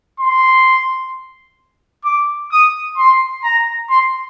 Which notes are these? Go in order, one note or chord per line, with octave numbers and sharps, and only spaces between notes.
C6
D6
D#6
C6
A#5
C6